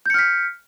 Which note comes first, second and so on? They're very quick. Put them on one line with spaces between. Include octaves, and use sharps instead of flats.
G6 C#7 F6 B6